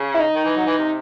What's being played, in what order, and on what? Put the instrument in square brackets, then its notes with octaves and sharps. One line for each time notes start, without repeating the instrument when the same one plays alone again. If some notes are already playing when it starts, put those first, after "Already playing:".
Already playing: [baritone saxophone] C#3
[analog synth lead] E4
D#4
[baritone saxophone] D#3
E3
F#3
E3
C3